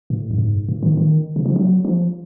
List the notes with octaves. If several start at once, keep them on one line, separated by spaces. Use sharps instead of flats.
A2
G2
G#2
A2
D#3
D#3
C#3
F3
F#3
F3